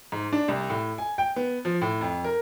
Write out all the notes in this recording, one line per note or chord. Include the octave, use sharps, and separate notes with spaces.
G#2
D4
C2
A2
G#5
G5
B3
F3
A2
F2
A#4